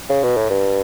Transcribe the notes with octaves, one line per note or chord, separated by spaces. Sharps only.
C#3
B2
A2
G2